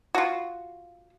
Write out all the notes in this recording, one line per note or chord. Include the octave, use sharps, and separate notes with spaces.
F4 F#4